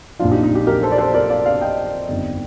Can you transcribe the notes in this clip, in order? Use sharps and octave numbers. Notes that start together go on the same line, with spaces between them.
A#1 A#2 F3 D4 F4
D#4 G4
D#4
D#4 G4
G4 A#4
A4 C5
D5
A4 C5
A#4 D5
D5 F5
D5 F5
D#5 G5
G1 F2 D#3